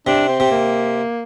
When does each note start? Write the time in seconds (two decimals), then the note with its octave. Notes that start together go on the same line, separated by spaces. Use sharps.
0.07 C3 D4
0.28 C4
0.40 C3
0.51 A#3